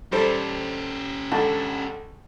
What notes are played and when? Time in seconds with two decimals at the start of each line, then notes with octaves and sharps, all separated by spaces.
0.12 G3 C#4 G4 A4 C5
1.31 C#2 D3 A5